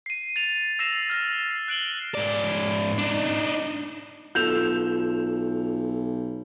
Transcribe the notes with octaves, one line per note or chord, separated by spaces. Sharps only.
C7 D#7
A6 D#7 F7
E6 A6 A#6 C7 E7
F6 A6 A#6
C7
F#6 D7 F#7 G7
G#2 D5
D4 D#4
B1 F4 A4 E6 G6 E7 F7